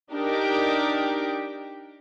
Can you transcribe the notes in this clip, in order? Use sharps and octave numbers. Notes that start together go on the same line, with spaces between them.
D4 D#4 G4 A#4